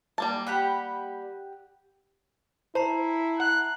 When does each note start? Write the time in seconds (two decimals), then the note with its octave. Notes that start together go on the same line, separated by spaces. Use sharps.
0.18 G3 A#3 A5
0.47 G4 F#5 B5
2.75 E4 C5 A5 A#5 C7
3.40 F#5 F#6